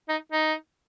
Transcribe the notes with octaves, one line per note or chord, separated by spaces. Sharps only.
D#4
D#4